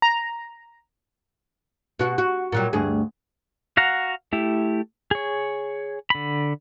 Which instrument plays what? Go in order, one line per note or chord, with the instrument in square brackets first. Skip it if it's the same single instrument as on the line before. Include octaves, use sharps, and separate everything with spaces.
[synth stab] A#5
[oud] B2 F#4
F#4
A#2 F#3 G3
D2 G2 G#4
[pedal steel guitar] F#4 F5 F#5 A#5
A3 E4 G4
G#4 C#5
D3 B5